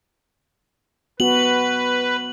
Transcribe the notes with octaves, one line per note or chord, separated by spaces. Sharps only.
B3 F#4 B4 F#7